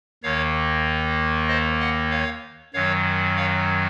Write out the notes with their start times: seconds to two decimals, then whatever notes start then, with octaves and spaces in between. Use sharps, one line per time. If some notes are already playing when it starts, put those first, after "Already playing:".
0.23 D#2 D#3 A#3 C#5 F5
1.48 C5 D#5
1.80 D#5 F#5
2.11 C#5 F5
2.74 F#2 D#3 F#3 C#5 F5
3.37 C#5 F5